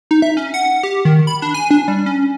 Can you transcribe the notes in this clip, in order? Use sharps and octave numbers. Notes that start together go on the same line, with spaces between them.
D#4
E5
C#4
F#5
G4
D#3
B5
D4
G#5
D4
G3
C#4